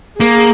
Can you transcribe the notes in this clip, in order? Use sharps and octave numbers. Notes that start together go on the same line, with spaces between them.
A#3 G#4